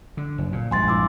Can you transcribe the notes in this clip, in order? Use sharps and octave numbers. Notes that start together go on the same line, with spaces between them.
D3
F#1
A#2
A#1 G2 G#3 G#5 C6 A6
E4 D6 E6